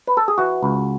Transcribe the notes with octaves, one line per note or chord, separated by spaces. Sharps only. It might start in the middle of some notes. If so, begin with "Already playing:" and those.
B4
A4
G#4
E3 F#4
C#2